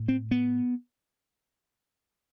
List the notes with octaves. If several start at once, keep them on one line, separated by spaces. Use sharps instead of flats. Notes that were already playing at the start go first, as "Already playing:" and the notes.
Already playing: A2
C4
B3